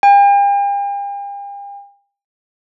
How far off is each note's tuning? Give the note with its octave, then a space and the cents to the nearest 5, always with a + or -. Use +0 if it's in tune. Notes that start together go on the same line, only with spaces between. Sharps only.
G5 +45